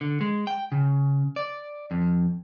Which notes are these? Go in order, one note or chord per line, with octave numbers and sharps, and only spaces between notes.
D3
G#3
G5
C#3
D5
F2